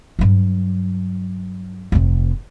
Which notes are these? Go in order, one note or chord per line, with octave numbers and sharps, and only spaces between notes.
G2 F#3
F1 C3